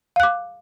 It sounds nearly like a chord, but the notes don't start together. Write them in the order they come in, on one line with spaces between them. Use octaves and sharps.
F5 F#6 D6